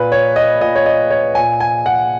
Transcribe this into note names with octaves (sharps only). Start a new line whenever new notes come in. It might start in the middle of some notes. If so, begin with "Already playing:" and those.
Already playing: A#2 B4
C#5
D#5
A#2 D#5
C#5
D#5
C#5
A#2 G#5
G#5
F#5